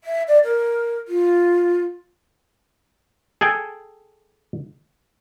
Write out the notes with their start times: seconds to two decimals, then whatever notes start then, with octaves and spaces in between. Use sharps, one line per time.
0.04 E5
0.28 D5
0.44 A#4
1.08 F4
3.41 G#4 A4 G5 G#5